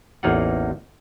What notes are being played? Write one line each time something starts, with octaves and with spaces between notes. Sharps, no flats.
A1 E2 A#3 D#4 F4 F#5